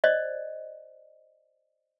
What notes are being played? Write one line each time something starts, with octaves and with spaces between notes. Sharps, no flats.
C5 D5 D#5